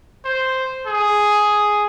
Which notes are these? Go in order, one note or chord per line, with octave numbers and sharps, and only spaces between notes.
C5
G#4